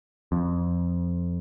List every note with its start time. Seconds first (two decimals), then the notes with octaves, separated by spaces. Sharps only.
0.32 F2